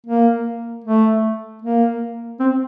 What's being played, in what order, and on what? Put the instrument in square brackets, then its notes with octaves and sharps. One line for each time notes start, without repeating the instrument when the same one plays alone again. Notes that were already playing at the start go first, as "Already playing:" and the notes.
[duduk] A#3
A3
A#3
C4